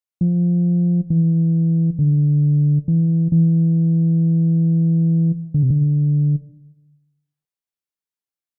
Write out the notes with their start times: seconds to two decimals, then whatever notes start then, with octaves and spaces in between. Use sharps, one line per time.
0.21 F3
1.10 E3
1.99 D3
2.88 E3
3.32 E3
5.54 D3
5.62 C3
5.70 D3